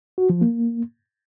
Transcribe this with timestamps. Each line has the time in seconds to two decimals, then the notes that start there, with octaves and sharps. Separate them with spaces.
0.18 F#4
0.30 F3
0.41 A#3